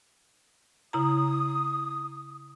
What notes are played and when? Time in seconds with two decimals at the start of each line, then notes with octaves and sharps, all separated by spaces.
0.93 C#3 E4 A#5 D#6